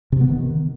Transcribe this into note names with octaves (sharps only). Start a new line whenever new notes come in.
C3
B3
D#3